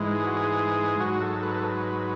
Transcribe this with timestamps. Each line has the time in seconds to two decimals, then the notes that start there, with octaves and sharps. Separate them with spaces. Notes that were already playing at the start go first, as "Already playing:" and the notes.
Already playing: G#2 E3 G#3
0.15 G#4
0.26 F#4
0.37 G#4
1.00 G#2 F#3 F#4
1.22 A4
1.43 B4
1.54 A4
1.64 B4